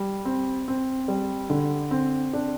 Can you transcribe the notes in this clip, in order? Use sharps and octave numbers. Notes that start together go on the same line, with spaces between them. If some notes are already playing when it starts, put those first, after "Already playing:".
Already playing: G3
C4
C4
G3
D3
C4
D4